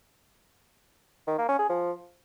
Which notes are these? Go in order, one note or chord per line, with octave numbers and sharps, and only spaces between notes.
D#3
A#3
C#4
G#4
F3